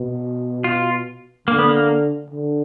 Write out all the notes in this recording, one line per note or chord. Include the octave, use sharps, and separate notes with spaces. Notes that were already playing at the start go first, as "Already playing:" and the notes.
Already playing: B2
F4
D3 A#3
B3
A#3
D3